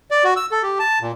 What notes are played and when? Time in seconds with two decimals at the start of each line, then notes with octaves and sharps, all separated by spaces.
0.11 D5
0.24 F#4
0.36 E6
0.51 A4
0.63 G4
0.79 A5
1.01 A#2